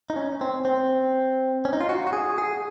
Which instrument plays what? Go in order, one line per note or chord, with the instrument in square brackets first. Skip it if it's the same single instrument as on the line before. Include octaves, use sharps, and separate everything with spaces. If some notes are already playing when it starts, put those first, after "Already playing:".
[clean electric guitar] D#4
C#4
C4
C4
C#4
D#4
F4
F#4
F#4
G#4
G#4